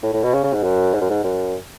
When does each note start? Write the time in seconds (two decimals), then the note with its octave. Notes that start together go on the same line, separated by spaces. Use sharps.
0.03 A2
0.13 A2
0.23 B2
0.33 C#3
0.44 C#3
0.53 G#2
0.63 F#2
0.94 G#2
1.01 F#2
1.10 G#2
1.24 F#2